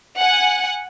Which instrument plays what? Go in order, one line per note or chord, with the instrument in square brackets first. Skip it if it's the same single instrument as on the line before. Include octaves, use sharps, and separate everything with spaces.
[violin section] F#5 G#5